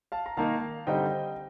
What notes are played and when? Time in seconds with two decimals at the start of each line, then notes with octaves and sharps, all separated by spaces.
0.12 F5 A5
0.26 A#5
0.37 D#3 A#3 D#4 F5 A5
0.87 D3 G3 C4 D#4 D#5 G5